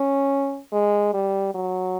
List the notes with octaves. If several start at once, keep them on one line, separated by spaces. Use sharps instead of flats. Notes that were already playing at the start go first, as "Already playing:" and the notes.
Already playing: C#4
G#3
G3
F#3